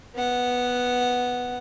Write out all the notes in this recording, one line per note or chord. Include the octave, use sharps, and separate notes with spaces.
B3 F#5